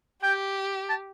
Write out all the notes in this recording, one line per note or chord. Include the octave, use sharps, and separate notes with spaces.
G4 G5
A5